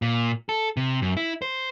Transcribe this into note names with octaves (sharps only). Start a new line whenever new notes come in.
A#2
A4
C3
F#2
E4
C5